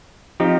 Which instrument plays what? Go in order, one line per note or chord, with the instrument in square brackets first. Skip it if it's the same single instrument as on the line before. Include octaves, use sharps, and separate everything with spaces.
[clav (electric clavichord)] F3 C4 D#4 G4